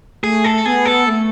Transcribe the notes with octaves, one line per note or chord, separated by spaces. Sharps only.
A3 G#4
A4
B3 G#4
A4
A3